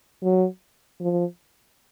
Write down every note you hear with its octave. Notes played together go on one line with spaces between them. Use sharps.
F#3
F3